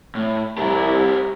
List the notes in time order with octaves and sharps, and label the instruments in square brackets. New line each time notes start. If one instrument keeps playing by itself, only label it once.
[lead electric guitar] A2
[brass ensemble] C2 E4 [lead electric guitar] G4 A#4